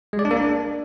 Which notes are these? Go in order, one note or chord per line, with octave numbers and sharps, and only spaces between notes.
G#3
D5
D4
A#3
D4